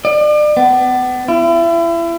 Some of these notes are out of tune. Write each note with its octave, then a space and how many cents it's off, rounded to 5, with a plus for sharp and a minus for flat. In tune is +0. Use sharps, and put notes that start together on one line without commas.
D5 +35
B3 +35
E4 +35